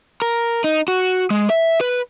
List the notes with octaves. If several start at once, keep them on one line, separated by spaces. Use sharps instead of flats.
A#4
D#4
F#4
G#3
E5
B4